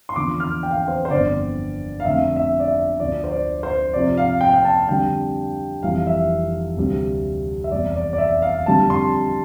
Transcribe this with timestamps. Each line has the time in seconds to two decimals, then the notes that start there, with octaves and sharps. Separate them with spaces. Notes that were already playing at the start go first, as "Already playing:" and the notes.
0.09 C6
0.16 E2 D3 F3 D6
0.40 F6
0.63 G5
0.71 F5
0.77 G5
0.88 C5
1.05 C5
1.10 G1 F2 D3 D5
2.00 F5
2.05 F2 D3 A3 E5
2.36 E5
2.60 D5
2.68 E5
2.99 D2 D3 F3 D5
3.24 C5
3.31 D5
3.63 C5
3.93 F2 C3 F3 D5
4.17 F5
4.41 G5
4.53 G5
4.65 A5
4.88 F2 D3 G3 G5
5.83 F1 F2 E3 G3 F5
6.07 E5
6.77 D2 C3 G3
7.64 E5
7.71 F1 E2 C3 G3 D5
7.96 D5
8.13 D5
8.18 E5
8.42 F5
8.66 F2 D3 G3 A5
8.90 C6